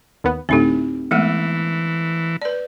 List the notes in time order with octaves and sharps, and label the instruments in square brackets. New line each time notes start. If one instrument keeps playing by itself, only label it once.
[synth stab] D#2 B3
[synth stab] D2 A2 [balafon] C4 D#4 G4
[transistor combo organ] E3 [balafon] G#3 A3 B3
[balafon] B4 D5